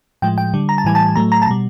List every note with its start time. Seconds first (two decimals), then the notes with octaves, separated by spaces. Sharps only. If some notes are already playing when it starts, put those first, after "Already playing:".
0.22 A2 F3 G#3 G5
0.38 G5
0.54 D3 G3
0.69 A#5
0.78 A5
0.84 A2 E3 G3 G#5
0.95 A5
1.16 A2 F#3 A3 A#5
1.32 A#5
1.42 A5
1.46 B2 G3 A#5